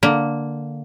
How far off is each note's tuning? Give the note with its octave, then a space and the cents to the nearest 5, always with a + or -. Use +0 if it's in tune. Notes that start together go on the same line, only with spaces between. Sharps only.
D3 +0 A#3 +0